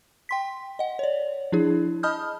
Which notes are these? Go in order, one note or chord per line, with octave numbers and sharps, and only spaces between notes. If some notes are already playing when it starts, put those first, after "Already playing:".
G5 C6 B6
D#5 F#5
C#5 D5
F3 D4 E4 G#4
D#5 A5 B5 D#6 F6 G6